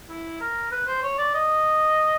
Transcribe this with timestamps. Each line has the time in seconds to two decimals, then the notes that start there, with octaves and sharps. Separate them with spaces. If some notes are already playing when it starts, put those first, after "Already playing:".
0.09 E4
0.40 A#4
0.71 B4
0.87 C5
1.03 C#5
1.18 D5
1.34 D#5